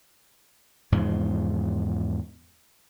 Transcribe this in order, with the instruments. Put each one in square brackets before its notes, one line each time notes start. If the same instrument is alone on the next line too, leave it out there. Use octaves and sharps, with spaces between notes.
[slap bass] E2 G#2 C#3 F3